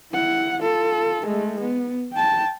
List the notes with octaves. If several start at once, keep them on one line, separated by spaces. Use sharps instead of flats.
E4 F#5
F4 A4
G#3 A3
B3
G5 A5